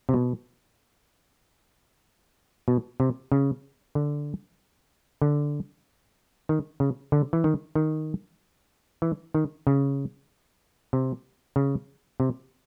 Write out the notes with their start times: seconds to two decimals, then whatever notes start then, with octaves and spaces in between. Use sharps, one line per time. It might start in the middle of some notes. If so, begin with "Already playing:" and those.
0.09 C3
0.14 B2
2.68 B2
3.00 C3
3.32 C#3
3.95 D3
5.22 D3
6.49 D#3
6.80 C#3
7.12 D3
7.33 E3
7.44 D#3
7.75 D#3
9.02 E3
9.35 D#3
9.67 C#3
10.93 C3
11.56 C#3
12.20 C3